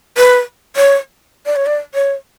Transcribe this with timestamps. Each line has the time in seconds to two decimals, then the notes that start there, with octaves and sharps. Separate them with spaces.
0.17 B4
0.76 C#5
1.46 D5
1.56 C#5
1.66 D5
1.95 C#5